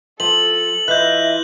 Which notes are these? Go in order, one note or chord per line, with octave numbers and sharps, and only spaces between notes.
F3 A4 F#7
E3 F4 D#5 E5 F#6 G6